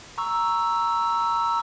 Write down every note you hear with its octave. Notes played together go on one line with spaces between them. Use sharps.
A#5 C#6 E6